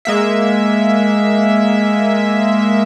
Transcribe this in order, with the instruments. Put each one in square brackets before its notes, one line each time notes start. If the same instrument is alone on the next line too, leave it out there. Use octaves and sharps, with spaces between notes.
[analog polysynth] G#3 A#3 E5